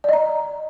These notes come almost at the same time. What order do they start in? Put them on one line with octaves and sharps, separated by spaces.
D5 D#5 A#5